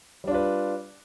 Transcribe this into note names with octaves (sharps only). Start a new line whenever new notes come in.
G3 D4 F4 B4